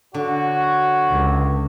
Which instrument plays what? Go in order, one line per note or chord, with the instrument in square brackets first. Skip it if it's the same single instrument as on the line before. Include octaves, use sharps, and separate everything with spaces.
[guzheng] D3 [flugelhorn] F#4 [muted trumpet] C#5
[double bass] C#2